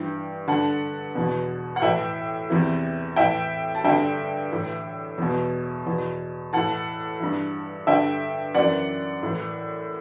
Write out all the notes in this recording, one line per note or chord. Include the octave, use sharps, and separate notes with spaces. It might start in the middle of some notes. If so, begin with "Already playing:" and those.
Already playing: G2 E3 G5
G2 D3 F#5 A5
E2 B2
F#5
A2 E3 E5 G5
E2 C3 E3
A2 E3 E5 G5
A5
G2 D3 E5 G5
A2 E3
E2 B2
E2 B2
A2 E3 F#5 A5
G2 E3
G2 D3 E5 G5
F#2 E3 D5 F#5
A2 E3